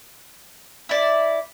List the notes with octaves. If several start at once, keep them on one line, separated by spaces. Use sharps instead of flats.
E4 D5